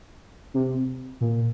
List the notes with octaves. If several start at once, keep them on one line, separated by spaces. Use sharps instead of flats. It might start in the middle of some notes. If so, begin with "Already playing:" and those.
C3
A#2